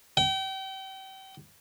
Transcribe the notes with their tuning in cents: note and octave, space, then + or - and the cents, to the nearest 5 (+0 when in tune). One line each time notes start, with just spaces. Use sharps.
G5 -35